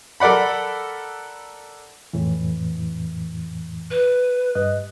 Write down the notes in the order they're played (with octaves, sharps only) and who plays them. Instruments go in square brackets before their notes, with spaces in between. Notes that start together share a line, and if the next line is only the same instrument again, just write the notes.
[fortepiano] A4 A#4 D5 F#5 B5
[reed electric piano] F2 A2 E3
[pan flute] B4
[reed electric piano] G2 D#5 F#6